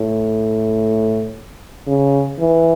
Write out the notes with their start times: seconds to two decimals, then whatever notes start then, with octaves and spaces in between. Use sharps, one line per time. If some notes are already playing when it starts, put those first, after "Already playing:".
Already playing: A2
1.87 C#3
2.40 E3